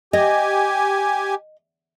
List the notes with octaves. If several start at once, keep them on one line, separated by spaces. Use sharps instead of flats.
G4 D#5 G#5